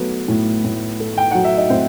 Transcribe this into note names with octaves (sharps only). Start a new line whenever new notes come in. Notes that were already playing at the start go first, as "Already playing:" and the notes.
Already playing: F#3 A3 B3 B4
A2
A2
A3
G5
F#3 F#5
E5
D#5
A2 C4 C5